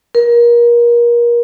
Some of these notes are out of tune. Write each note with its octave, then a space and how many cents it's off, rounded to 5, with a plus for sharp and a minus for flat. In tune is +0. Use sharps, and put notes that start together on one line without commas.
A#4 +30